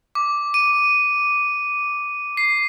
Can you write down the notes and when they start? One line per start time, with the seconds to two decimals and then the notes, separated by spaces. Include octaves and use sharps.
0.15 D6
0.54 D#7
2.37 C7